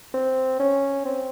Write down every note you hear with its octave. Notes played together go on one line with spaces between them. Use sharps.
C4
C#4
C4